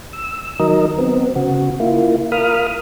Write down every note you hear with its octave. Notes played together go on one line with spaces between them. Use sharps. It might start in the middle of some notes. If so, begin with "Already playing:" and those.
E6
D#3 F#3 A#4 D#5
B3 C4
C#3 F#4
A#3 E4 F4
A#4 F5 B5 D#6 F6